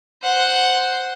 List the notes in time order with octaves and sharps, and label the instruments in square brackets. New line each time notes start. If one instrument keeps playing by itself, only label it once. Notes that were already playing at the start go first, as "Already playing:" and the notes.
[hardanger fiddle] C5 F#5